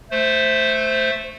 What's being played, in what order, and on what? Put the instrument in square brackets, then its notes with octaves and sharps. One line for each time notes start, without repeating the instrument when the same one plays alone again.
[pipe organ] A3 C5